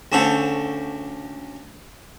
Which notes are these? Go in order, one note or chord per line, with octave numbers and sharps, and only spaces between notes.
D2 C#3 A4 C5 F#5